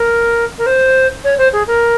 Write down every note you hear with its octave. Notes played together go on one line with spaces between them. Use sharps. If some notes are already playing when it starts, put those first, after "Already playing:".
Already playing: A#4
A#4
C5
C#5
C5
G#4
A#4